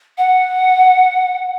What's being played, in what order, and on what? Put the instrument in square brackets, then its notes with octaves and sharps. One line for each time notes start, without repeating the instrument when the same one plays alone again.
[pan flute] F#5